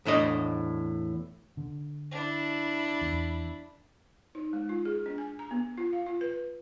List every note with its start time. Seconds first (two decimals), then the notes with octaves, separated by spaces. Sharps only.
0.05 E2 A2 D4 D#5
1.57 D3
2.11 D4 E4
3.01 E2
4.35 D#4
4.53 G#3
4.69 F4
4.85 G#4
5.06 D4
5.18 G#5
5.39 A#5
5.51 B3
5.78 F4
5.93 F5
6.06 F4
6.21 B4